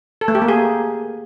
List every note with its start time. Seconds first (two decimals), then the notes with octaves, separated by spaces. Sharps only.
0.21 A4
0.28 A3
0.35 G4
0.42 A#3
0.48 G#4